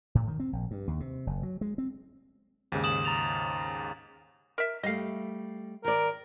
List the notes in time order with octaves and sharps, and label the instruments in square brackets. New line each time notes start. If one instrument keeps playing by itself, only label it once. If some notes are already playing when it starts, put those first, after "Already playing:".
[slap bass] A2
D#3
C4
A#1
G2
D#2
C3
F#1
F#3
G#3
C4
[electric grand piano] D#2 G#2 C#3
[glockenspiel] D#6 E7 F#7
A#5 A6 F7
[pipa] A#4 E5
[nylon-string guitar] G3 A3 [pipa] D#5 F5
[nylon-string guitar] D#3 D5 [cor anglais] A#4